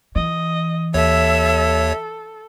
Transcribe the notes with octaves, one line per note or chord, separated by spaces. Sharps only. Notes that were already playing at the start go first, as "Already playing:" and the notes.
E3 D#5
D#2 A4 C#5 E5